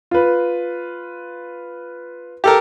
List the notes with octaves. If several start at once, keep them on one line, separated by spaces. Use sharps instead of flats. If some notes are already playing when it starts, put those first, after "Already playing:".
F4 B4
G4 A4 A#4